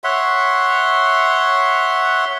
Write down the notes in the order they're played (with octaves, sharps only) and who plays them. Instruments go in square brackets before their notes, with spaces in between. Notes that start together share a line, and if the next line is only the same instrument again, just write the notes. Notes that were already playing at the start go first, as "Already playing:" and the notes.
[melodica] C#5 E5 F#5 C6